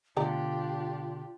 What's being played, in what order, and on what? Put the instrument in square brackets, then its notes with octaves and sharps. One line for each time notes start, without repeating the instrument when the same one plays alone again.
[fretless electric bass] B2 D3 [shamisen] A3 D5 A#5 [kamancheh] D4 G4 [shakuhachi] F4